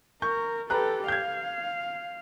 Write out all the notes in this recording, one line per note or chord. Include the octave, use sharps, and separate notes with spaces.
A#4 C#6 G6
G4 A4 B4 A#5 F#6
F5 G6 G#6